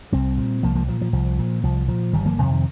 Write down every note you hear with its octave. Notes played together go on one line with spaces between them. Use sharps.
C2 G3 C4
A#2
C2 F3 A#3
F3 A#3
A#2 F3
F3
C2 F3
A#2
C2 F3
A#2 F3
G1 D#3 G3
F3 A#3
F2 C3 D#3
D#3